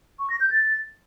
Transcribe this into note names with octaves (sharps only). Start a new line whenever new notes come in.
C#6
A#6
G6
A6